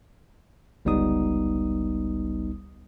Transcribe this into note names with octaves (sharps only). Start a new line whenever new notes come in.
G1 C#2 G3 B3 D#4 D#6